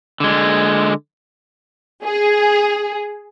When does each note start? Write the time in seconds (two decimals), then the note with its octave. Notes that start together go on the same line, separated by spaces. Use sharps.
0.20 D3 G#3
2.04 G#4